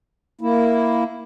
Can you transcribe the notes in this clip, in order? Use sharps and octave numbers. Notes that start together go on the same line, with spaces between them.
A#3 E4